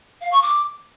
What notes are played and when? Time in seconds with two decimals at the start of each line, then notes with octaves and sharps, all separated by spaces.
0.21 F5
0.32 C#6
0.43 D6